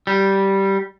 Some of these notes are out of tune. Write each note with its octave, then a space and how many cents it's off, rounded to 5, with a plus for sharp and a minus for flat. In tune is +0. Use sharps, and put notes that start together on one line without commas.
G3 -10